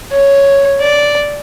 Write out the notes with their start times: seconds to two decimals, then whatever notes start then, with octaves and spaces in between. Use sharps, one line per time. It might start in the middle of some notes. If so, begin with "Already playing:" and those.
0.12 C#5
0.81 D5